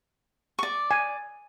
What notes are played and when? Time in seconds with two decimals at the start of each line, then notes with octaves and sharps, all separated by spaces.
0.59 D5 C#6
0.91 G#5